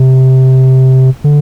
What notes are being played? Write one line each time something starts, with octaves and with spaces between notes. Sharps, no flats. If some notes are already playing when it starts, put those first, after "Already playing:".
Already playing: C3
D3